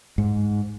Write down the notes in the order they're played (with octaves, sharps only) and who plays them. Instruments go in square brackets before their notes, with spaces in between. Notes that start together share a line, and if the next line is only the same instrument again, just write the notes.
[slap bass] G#2